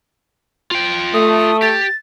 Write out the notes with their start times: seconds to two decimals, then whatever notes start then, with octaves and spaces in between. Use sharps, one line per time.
0.71 F4 G5
1.14 A3 D#6
1.62 G4 A6